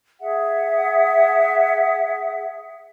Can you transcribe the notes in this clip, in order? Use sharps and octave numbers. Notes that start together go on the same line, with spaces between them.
G#4 E5 F#5